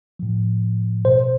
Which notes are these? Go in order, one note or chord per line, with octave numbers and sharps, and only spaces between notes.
A2 F3
B2 C5